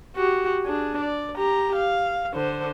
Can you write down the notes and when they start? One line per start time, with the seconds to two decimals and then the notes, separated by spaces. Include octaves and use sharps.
0.16 F#4 G4
0.64 D4 G#4
1.01 D5
1.37 G4 A#5
1.76 F5
2.34 D3 C5